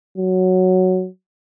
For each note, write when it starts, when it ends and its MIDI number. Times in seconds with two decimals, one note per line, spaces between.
0.18 1.07 54